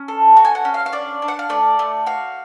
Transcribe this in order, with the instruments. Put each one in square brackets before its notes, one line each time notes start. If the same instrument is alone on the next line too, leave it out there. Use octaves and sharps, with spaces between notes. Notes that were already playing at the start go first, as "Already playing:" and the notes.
Already playing: [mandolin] C#4
A4
F#4
G#5
F#5
C#4
F5
F5
D4 D5
D4
F#5
F5
A3 D5
A3
F#4 F5